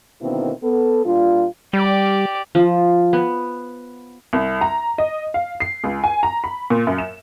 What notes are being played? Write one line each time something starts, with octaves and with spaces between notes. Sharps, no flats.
B2 D3 D#3 A#3 C4 E4
B3 A4
A#2 G3 D4 F4
G3 G4 D5
F3
B3
C2
A#5
D#5
F5
C7
C#2
G#5
A#5
B5
A#2
F#2
E7